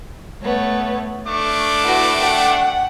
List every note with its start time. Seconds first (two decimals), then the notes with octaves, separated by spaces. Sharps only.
0.42 A3 B3 C#5
1.26 A3 D4 C#6 D6
1.81 E4 F#4 B4
2.21 F#5 G5